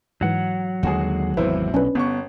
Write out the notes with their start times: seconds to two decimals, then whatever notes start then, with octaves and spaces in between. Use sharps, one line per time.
0.21 G#2 E3 F#3 F#5
0.83 D#2 D3 G#3 F#4 G#4
1.37 G#1 E2 C3 E4 B4 C5
1.74 B1 C#4 D4 B4
1.95 G1 B3 C#6